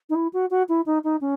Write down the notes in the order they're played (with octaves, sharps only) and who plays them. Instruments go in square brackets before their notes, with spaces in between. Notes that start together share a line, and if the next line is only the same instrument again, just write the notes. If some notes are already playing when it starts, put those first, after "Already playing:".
[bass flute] D#4
E4
F#4
F#4
E4
D#4
D#4
C#4